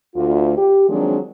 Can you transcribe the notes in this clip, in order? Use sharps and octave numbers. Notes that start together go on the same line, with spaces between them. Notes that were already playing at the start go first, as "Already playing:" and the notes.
D2 F4
G4
D#3 F3 F#3 G#3 C4 D4